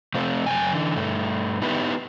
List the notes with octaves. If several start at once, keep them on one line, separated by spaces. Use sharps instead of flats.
C3 F3 A3 C4 F4
F#2 G5 G#5
D3 E3
G2 A3
B3 D#4 E4 G4 B4